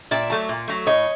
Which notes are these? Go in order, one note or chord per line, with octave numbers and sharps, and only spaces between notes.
A#2 D5 E5
F#3 A3
A#2
F#3 A3
A2 C#5 D#5